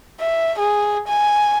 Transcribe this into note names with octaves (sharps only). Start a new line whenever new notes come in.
E5
G#4
G#5